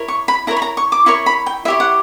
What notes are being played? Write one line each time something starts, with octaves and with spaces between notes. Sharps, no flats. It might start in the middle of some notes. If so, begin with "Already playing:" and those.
Already playing: E4 A#4 C#5
C#6
B5
E4 A#4 C#5 A#5
B5
A#5
C#6
D6
E4 A#4 C#5 C#6
B5
G5
E4 G4 C#5 E5
F#5